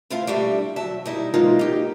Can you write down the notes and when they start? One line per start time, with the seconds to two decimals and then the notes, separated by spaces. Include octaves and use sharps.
0.10 A3 E4 F4 A#4 F5
0.27 G3 A3 D4 E4 G4
0.76 D#2 F#3 E5 A5
1.06 G3 D#4 E4
1.34 E3 F#3 G#3 A#3 D#4 F4
1.59 D#4 G4